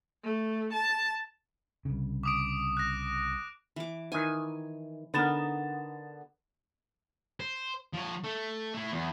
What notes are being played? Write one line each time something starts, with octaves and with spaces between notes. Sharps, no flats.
A3
A5
C2 C#3
D6 D#6 D7
F#6 A#6
E3 D6
D#3 E3 G#5
D3 B3 D#4 A#4 B4 A6 E7
C5
F3 C#5
A3
A3 E4
E2